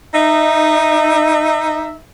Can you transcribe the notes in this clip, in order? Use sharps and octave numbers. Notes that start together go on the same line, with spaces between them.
D#4 E5